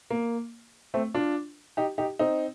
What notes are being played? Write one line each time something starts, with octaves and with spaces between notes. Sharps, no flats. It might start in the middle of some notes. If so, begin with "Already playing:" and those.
A#3
A3 C4
D4 F4
D#4 G4
D#4 G4
C4 D#4